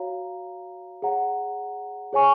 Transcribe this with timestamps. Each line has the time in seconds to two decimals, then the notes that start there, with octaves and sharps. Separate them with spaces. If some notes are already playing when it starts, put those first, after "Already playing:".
Already playing: F#4 C#5 F5 A#5
1.02 G#4 C#5 F#5 A#5
2.13 G#4 C#5 G#5 C#6